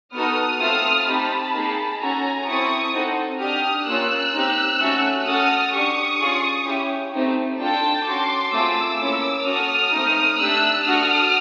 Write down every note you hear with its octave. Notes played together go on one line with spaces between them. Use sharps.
B3 D#4 F#4 A4 D#6 F6
A3 C4 F4 A4 D#6 F6
C4 D#4 G4 A5 B5
A#3 D#4 G#4
C#4 F#4 A4 G#5 A#5
C4 E4 A4 C#6 D#6
C4 D#4 F#4 A4
D4 G4 D#6 F6
A#3 C#4 F4 E6 F#6
C4 D#4 G4
A3 C#4 F#4 A4
C#4 F#4 A4 D#6 F6
D4 G4 C#6 D#6
C#4 F4 G#4
C#4 E4 G4
A3 C4 D#4 G4
D4 F4 A4 G5 A5
C#4 F#4 A4 C6 D6
A3 C4 F4 G#4 D6 E6
A#3 C#4 E4 A4
C#4 F#4 A4 D#6 F6
A3 C4 D#4
A3 D4 G4 E6 F#6
D4 F#4 A4 D#6 F6